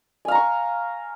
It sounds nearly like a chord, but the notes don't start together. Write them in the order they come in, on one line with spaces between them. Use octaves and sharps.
G#5 F5 A#5 C#6